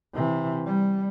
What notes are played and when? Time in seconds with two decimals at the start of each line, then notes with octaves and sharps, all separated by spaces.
0.14 C3 E3
0.66 G3